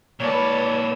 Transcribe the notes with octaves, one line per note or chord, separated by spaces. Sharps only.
A#2 A4 B4 C#5 D5